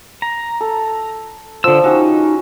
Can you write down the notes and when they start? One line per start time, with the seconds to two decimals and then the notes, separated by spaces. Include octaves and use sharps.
0.22 A#5
0.61 A4
1.64 D3 F3 E6
1.84 C#4 D#4 F#4 G4